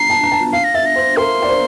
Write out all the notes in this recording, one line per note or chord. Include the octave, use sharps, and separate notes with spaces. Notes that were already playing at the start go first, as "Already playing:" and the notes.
Already playing: A#5 C7
A5
A#5
A5
F5 C7
A#6
E5 A6
A#6
C5
A#4 C6
D5
C5